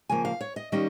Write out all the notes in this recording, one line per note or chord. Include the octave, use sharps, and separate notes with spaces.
C#3 F3 A#3 G#5
F5
C#5
D#5
D#3 G3 A#3 C#4 D#5